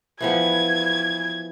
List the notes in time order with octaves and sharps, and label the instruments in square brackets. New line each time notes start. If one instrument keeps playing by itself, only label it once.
[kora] E3 F3 B3 [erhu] G#6